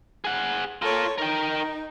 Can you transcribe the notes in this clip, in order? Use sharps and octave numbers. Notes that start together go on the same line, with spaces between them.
G#4 F#5
F4 A4 A#4 C#5
D#4 A#4 G5